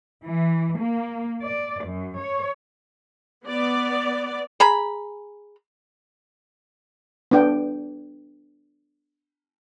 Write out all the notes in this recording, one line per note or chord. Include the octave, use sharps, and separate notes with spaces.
E3
A#3
D5
F#2
C#5
B3 D5
G#4 A#5 B5
B3 D4 G5